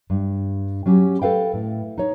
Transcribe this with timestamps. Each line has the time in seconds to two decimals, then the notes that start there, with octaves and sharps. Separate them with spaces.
0.10 G2
0.86 F#3 C#4 G4
1.22 A4 B4 F5 G5
1.54 A2
1.98 D#4 C#5